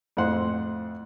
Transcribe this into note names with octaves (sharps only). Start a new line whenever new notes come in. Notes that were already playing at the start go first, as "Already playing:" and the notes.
F2 A2 C5 F#5 C6